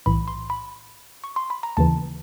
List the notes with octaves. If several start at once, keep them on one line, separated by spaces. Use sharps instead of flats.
B1 A2 E3 B5
C6
B5
C#6
C6
B5
A#5
D#2 C#3 E3 A5